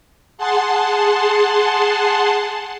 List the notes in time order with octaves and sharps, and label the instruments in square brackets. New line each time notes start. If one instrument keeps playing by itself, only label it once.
[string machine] G#4 F#5 A5 C6